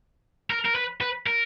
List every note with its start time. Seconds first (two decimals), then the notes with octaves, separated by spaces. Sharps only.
0.50 A#4
0.66 A#4
0.76 B4
1.01 B4
1.27 A#4